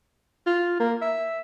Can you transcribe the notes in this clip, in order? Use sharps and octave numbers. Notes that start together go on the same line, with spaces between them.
F4
A#3
E5